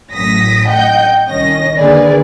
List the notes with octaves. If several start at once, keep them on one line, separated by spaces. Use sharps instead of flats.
A1 F#2 A2 D#6 A#6 B6
D#5 F#5 G5 G6
C2 D#3 C#4 D#5 A#6
D3 D#3 A#3 G#4 B4 D5